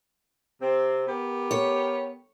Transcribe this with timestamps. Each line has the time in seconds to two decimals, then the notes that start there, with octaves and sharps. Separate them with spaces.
0.61 C3 C4
1.07 B3 G4 A#4
1.51 C#5